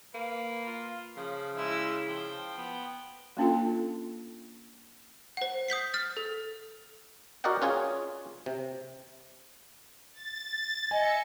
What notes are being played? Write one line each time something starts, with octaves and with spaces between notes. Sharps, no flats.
A#3 B4
F4
C#3 F3
G#3 E4 E6
F3 G5
B3
A#3 C#4 D4 F4 A4
C5 F#5
D#6 G6 B6 C7
F6 A6
A4
F#4 A#4 D5 D#5 F#5 G5
C#4 F4 G#4 C#5
C3
A6
D#5 E5 G#5 C#7